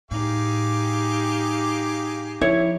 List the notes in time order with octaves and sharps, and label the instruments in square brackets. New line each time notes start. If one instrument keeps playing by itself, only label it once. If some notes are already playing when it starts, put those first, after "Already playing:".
[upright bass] A2 [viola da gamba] D#4 G4 [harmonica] G#4 F5 D6
[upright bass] F3 [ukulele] E4 C#5